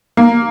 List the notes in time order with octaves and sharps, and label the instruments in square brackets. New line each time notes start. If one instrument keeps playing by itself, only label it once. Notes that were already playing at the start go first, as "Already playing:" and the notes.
[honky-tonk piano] A#3